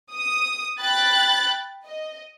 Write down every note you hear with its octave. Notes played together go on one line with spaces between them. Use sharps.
D#6
G5 B5 F#6 A6
D#5